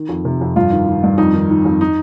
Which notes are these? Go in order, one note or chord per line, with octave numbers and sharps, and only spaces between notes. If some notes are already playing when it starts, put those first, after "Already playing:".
Already playing: D#3
F2
C3
F2
G2 F4
D#3
D#3
G2
F2 D#4
D#3
D#3
F2
D#4